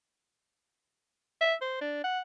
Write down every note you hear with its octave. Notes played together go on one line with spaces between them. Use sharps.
E5
C5
D4
F#5